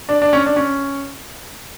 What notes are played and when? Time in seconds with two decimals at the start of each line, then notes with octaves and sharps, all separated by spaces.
0.09 D4
0.22 D4
0.33 C#4
0.46 D4
0.56 C#4